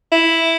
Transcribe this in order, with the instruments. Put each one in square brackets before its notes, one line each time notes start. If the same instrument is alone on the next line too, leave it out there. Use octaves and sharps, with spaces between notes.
[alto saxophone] E4